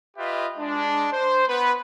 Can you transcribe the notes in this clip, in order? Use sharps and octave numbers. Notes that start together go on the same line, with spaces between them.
F4 G4 B4 D#5 E5
G#3 D4
C5
B3 B4